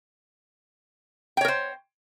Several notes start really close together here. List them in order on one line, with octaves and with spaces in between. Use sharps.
G5 C#5 A#4 C5